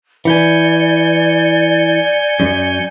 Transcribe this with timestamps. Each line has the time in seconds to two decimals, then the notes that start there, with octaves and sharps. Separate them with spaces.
0.25 E3 D5 G#5 G6 C#7
2.40 F#2